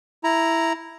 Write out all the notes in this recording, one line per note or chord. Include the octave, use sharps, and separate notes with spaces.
E4 A#5